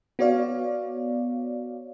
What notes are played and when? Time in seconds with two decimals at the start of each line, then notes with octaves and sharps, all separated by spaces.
0.19 B3 F#4 C#5 D5 F5